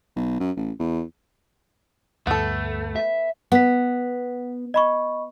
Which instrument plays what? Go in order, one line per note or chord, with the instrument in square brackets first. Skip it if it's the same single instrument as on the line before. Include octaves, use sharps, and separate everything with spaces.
[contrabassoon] B1
F#2
A1
E2
[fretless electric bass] D2 G2 [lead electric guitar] A3 [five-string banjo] B3 A4
[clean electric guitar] E5
[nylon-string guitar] B3 [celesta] F#5 B6
[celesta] D#5 B5 C#6